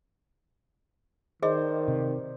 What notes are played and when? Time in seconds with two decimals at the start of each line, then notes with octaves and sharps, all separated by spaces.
1.43 D#3 G#4 C5 D5 D#5
1.88 C3